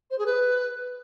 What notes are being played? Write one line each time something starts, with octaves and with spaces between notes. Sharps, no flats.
C5
G#4
B4